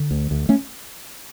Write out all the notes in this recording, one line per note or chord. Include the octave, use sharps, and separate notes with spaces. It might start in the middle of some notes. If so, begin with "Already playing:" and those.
Already playing: D3
D2
D2
A3 C#4